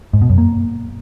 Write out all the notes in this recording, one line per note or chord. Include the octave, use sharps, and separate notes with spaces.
G#2
B2
F#2
A#3